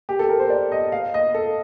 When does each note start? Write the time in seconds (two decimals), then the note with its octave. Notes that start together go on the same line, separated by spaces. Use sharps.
0.09 G4
0.19 A4
0.29 A#4
0.40 C5
0.50 D5
0.72 D#5
0.92 F5
1.14 D#5
1.34 A4